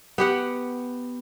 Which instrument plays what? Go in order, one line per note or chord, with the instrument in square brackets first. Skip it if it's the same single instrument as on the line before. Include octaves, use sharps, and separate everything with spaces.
[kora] B3 G4 F#5